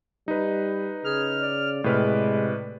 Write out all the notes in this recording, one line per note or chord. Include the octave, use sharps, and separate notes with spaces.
G3 D#4 B4
C#3 G#4 F6
D5
A2 C3 G#3 B4 F6